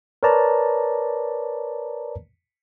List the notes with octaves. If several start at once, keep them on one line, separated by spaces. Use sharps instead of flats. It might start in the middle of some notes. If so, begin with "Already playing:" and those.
A#4 B4 C#5 D5 A5 A#5